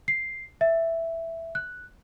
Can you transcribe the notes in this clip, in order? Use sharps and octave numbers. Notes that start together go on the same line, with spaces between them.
C7
E5
F#6